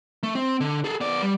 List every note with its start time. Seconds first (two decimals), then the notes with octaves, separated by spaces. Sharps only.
0.23 A3
0.35 C4
0.60 D3
0.84 G#4 A4
1.01 B3 D5
1.22 G3